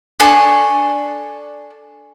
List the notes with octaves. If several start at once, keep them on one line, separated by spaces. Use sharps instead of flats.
D4 A4 G#5 C#6